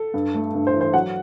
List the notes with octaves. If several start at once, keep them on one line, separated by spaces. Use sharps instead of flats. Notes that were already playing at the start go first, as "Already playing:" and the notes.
Already playing: A4
G2
A3
G2
C5
E3
C5
F#3 F#5